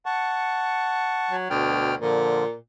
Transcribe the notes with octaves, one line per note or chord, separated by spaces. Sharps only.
F#5 A5 C#6
F#3
D2 B2 G5 F6
A#2 D3 F3